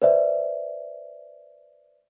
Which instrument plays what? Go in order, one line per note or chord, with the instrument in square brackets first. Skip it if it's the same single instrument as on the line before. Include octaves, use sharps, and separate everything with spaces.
[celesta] B4 C5 D5 E5